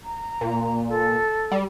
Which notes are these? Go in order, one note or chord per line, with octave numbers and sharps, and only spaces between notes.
A#5
A#2
A4
G3